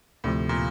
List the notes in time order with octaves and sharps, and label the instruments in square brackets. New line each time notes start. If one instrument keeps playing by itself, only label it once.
[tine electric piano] D2 C3 F3 [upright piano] A2
[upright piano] A#2